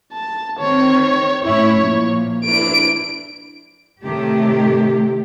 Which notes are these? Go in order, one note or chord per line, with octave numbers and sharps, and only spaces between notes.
A5
D#3 C4 C#5
A2 C#4 E4 C#5
A#2 F3
D4 E4 D7
A2 C3 D#3 A3 G4